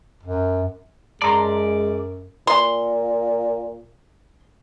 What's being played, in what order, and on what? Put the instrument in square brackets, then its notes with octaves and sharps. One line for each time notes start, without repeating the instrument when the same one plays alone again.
[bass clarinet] F#2
[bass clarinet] F#2 [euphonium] G#3 [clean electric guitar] D5 [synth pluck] A5 A#5 C6
[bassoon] A#2 [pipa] C6